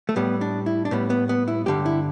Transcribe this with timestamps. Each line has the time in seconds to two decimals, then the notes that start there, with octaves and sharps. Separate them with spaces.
0.09 A3
0.16 A2 G3 B3
0.41 D4
0.66 E4
0.85 D4
0.91 A2 G3 B3
1.10 B3
1.29 B3
1.48 E4
1.66 G2 D3 G3 G4
1.86 E4